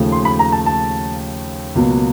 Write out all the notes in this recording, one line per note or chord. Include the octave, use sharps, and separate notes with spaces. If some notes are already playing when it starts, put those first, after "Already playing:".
Already playing: D#2 C#3 F3 A3
C6
B5
A#5
A5
A5
C#2 B2 F#3 A#3